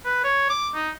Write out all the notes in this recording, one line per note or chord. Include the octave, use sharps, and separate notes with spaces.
B4
C#5
D6
D#4